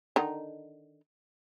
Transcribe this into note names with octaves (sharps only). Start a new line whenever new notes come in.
D3 D#3 D#4